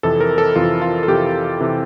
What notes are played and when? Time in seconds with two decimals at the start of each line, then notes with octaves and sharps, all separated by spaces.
0.03 F2 C3 E3 A4
0.21 A#4
0.38 A4
0.56 F2 C3 E3 F4
0.82 F4
1.03 A4
1.08 F2 C3 E3 G4
1.60 C3 E3